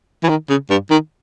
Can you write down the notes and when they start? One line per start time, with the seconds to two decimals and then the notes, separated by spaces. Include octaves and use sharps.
0.23 E3
0.29 D#3
0.49 C#3
0.70 G2
0.90 D#3